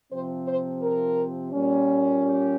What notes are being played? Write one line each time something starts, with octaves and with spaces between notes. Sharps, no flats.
C3 F3 C4 C5
C5
A#4
A#2 G3 C#4
G4